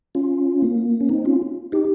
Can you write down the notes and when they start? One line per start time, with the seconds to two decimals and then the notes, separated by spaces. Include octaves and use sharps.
0.15 C#4 F4
0.62 A#3
1.01 C#4
1.09 C4 D#4
1.25 C#4 F4
1.72 D#4 G4